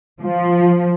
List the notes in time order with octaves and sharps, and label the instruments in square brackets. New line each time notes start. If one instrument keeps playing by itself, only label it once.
[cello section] F3